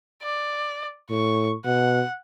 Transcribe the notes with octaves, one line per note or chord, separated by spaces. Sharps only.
D5
A2 C#6
B2 F#5